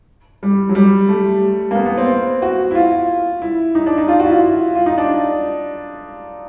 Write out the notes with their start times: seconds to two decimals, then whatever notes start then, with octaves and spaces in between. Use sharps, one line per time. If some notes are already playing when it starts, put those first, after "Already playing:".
0.43 G3
0.69 F#3
0.75 G3
1.09 A3
1.71 A#3
1.75 B3
1.86 B3
1.98 C4
2.42 F#4
2.71 E4
2.75 F4
3.42 E4
3.75 D#4
3.86 D4
3.98 D#4
4.08 F4
4.20 F#4
4.26 E4
4.31 F4
4.75 F4
4.86 D#4
4.97 D4